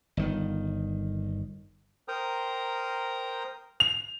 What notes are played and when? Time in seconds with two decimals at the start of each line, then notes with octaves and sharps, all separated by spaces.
0.17 G1 D#3
2.08 A#4 C5 G5 A#5 D#6
3.80 F7